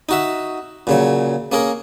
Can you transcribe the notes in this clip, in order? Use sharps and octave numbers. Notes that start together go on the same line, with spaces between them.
D#4 F#4 E5
A#2 C#3 F#3
A#3 C#4 G#4 A#4